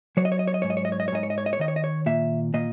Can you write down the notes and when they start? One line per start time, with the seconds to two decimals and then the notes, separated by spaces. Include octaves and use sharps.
0.17 F#3 C#5
0.25 D#5
0.32 C#5
0.39 D#5
0.48 C#5
0.54 D#5
0.62 G#2 C#5
0.70 D#5
0.77 C#5
0.85 D#5
0.92 C#5
1.00 D#5
1.08 C#5
1.12 G#2 D#5
1.23 C#5
1.30 D#5
1.38 C#5
1.46 D#5
1.53 C#5
1.59 D#3 D#5
1.68 C#5
1.76 D#5
1.84 C#5
2.06 A#2 E5
2.54 A#2 D#5